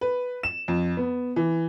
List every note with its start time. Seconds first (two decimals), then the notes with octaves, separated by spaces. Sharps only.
0.01 B4
0.43 E7
0.68 F2
0.97 B3
1.36 E3